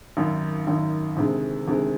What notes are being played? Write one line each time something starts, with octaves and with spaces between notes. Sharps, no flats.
G#1 F#2 D#3
G#1 F#2 D#3
D2 C3 D#3 G#3
D2 C3 D#3 G#3